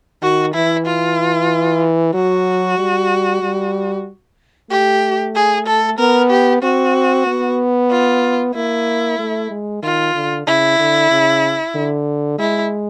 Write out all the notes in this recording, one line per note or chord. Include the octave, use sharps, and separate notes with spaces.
D#3 F#4
E3 E4
F4
F#3 F#4
G3
G3
A3 G4
G#4
A4
B3 A#4
G4
C4 F#4
B3
F4
A#3 E4
A3
G#3
D#3 F4
D3
C#3 E4
D3
C#3
D3
G#3 E4